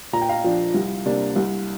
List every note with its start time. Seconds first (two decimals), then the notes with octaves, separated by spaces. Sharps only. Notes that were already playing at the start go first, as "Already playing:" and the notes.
0.13 A#2 A#5
0.22 G5
0.29 F5 A#5
0.44 F3 D4
0.74 C2
1.06 C3 A#3 D4
1.36 C2